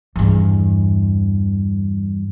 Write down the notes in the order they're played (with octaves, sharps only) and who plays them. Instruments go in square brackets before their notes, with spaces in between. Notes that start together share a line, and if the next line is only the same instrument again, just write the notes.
[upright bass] E2 G2